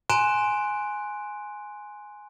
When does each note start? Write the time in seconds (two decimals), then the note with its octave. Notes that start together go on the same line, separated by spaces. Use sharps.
0.10 G#5 A#5 C6 F#6 D7 E7